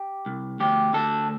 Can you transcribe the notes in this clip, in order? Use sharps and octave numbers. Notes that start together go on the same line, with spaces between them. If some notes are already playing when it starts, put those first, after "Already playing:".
Already playing: G4
C2
D2 G4
D2 A4